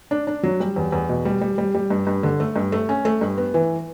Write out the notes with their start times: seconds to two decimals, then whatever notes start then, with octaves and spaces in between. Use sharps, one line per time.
0.11 D4
0.27 D4
0.43 F#3
0.60 G3
0.76 E2
0.92 E2
1.09 B2
1.25 G3
1.41 G3
1.58 G3
1.74 G3
1.90 G2
2.07 G2
2.23 D3
2.40 A3
2.56 G2
2.72 A3
2.89 C#4
3.05 A3
3.21 G2
3.38 B3
3.54 E3